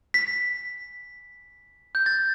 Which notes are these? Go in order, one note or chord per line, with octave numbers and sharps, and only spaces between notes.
B6
G6
A6